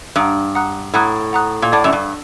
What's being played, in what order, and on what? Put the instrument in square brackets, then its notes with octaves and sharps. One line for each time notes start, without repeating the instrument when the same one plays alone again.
[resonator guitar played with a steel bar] G2 [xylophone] F#5 A#5 D#6 F#6
[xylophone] F#5 A#5 D#6 F#6
[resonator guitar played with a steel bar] A2 [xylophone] F#5 A#5 D#6 F#6
[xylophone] F#5 A#5 D#6 F#6
[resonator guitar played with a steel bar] A#2
[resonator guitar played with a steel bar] A2 [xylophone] D5 F#5 A5 D6
[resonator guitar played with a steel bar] F#2
G2